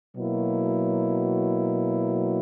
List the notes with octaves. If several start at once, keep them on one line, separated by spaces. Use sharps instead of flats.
B2 F#3 A#3 E4